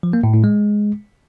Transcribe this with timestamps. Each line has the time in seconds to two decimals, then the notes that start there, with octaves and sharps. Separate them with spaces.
0.03 F3
0.13 A#3
0.24 A2
0.34 A2
0.44 G#3